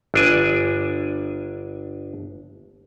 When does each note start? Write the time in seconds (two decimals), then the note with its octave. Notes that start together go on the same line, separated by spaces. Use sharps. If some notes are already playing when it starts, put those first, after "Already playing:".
0.14 G1 D4 G#5